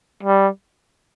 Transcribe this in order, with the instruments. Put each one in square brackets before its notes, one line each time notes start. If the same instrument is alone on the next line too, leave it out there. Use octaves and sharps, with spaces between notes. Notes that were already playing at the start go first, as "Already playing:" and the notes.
[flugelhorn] G3